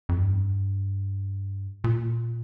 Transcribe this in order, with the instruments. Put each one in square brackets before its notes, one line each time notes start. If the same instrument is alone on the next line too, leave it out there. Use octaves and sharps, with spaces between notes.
[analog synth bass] F2
G2
A#2